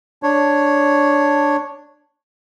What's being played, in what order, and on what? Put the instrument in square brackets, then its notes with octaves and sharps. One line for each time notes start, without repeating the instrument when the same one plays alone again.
[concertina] D4 C#5